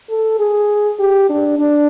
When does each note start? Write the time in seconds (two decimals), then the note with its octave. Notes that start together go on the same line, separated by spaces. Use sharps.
0.10 A4
0.39 G#4
1.00 G4
1.29 D4
1.59 D4